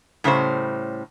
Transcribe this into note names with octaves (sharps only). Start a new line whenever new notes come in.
A2 C#3 G3 C#4 C5